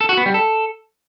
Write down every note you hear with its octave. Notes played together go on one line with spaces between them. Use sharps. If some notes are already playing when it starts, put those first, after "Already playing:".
A4
F#4
B3
G3
A4